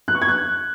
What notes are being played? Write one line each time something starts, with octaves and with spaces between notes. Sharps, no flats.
F#6
C#6
G#6
F#6